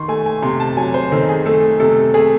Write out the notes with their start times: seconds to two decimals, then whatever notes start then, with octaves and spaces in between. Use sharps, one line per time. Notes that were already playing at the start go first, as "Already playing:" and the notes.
Already playing: D#3 C6 C#6
0.08 A3 G#5
0.26 G#5
0.42 C3 C6
0.60 A5
0.77 F#3 G#5
0.94 C5
1.12 D#3 A4
1.29 G#4
1.46 A3 A4
1.80 C3 A4
2.14 A3 G#4